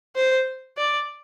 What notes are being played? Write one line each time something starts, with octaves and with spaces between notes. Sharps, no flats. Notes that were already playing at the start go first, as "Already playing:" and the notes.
C5
D5